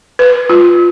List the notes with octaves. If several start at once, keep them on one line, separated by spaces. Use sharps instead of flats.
B4
F4